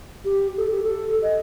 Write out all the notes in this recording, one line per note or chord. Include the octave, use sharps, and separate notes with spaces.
G4
A4
G4
A4
D#5